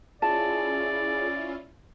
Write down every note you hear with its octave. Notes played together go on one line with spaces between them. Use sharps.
C#4 E4 F4 G#4 D5 A5